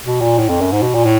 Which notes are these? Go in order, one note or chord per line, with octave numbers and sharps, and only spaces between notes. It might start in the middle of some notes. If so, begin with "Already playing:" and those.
B2
A#2
A2
F2
F#2
G#2
B2
A#2
A2